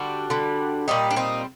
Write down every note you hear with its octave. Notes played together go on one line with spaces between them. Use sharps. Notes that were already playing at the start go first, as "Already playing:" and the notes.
Already playing: D3 G3 D4 F#4
D3 G3
A#2 G3 D#4 G4
D4
C4 D#4